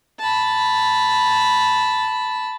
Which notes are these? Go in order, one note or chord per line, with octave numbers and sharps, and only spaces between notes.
A5 B5